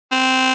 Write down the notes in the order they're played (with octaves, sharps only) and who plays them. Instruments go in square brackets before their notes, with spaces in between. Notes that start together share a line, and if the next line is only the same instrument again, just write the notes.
[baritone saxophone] C4